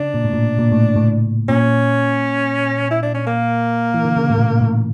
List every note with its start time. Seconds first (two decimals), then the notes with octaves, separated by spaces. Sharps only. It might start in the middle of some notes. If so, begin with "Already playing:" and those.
Already playing: C#3 D4
0.14 A#2
0.24 A2
0.33 A#2
0.59 A#2
0.72 A2
0.96 A2
1.48 A#2 C#4
2.91 E4
3.03 D4
3.14 C#4
3.27 A#3
3.94 E3
4.05 D3
4.16 C#3
4.30 A2
4.38 A#2
4.60 A2